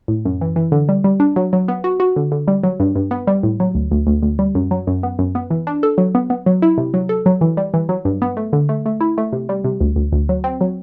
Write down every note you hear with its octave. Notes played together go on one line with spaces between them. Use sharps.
A2
F#2
E3
E3
D3
G3
G3
D4
F#3
F#3
B3
F#4
F#4
D3
D3
G3
F#3
G2
G2
B3
G3
A2
F#3
D2
D2
D2
D2
G3
F#2
F#3
F#2
B3
F#2
B3
E3
D4
A4
F#3
B3
B3
F#3
E4
C3
F#3
A4
F#3
E3
G3
E3
F#3
G2
B3
A3
D3
A3
A3
E4
A3
C3
G3
C3
D2
D2
D2
F#3
C4
F#3